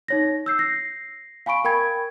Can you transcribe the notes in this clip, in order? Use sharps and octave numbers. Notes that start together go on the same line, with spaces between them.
D#4 C#5 A#6
E6 G6 C7
A#6 C7
F5 G#5 B5 C#6 D7
A#4 G5 B5 G#6